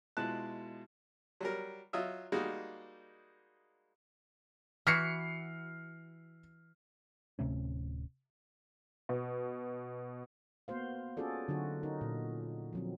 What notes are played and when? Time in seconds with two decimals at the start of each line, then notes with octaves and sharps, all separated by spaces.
0.17 B2 G#3 E4 F4 A5 F#6
1.41 F#3 G3 A#4
1.93 F#3 F4 D#5 E5
2.32 G3 G#3 A#3 D#4 F#4
4.87 E3 E4 F#4 F6 C7 C#7
7.39 D1 C3 A3 C#4
9.09 B2
10.68 A#3 B3 F#4 C5 F5
11.17 C#4 F4 F#4 G#4 A4 D5
11.48 D3 F#3 D#4 F#4
11.83 D#4 A#4
12.01 A#2
12.73 F3 F#3 C4